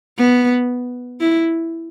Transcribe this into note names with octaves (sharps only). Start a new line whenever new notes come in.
B3
E4